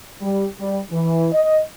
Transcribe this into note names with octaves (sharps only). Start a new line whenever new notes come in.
G3
G3
E3
D#5